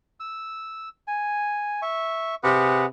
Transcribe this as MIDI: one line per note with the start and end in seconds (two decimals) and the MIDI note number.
0.20 0.89 88
1.08 1.81 80
1.82 2.35 76
1.82 2.35 85
2.43 2.85 48
2.43 2.86 68
2.43 2.86 71
2.43 2.86 78